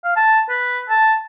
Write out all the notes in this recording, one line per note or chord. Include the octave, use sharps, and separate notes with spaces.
F5
A5
B4
A5